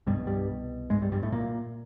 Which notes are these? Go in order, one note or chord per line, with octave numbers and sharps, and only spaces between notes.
C2 G2 B2 G3
G2 G3
G#2 G#3
G2 G3
G2 G3
A2 A3
A#2 A#3